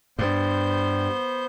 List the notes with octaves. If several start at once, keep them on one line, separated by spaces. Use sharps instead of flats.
G2 B3 C5 G6